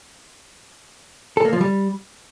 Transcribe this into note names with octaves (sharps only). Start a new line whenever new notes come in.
A4
A#3
F3
G3